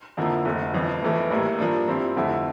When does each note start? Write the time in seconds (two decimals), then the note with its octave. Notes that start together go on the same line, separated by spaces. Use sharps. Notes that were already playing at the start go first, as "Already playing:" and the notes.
0.17 F2 D3 F3 A#3 E4
0.45 F1 F2 D3 A3
0.74 G1 F2 E3
1.02 F1 F2 E3 A3
1.30 A1 A2 G3 A#3 E4
1.59 G2 F3 A#3 D4
1.88 G2 F3 C4 E4
2.16 F1 F2 D3 A3 E4